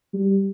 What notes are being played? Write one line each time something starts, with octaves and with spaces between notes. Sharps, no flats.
G3